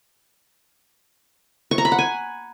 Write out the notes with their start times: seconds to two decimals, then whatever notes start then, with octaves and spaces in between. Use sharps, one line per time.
1.71 C#6
1.78 A#5
1.85 B5
1.92 F#5
1.99 G#5